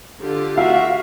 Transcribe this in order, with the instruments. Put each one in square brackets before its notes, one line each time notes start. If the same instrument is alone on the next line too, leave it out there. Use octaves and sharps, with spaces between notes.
[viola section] D3 F4 G4
[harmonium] F#4 E5 [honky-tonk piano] F5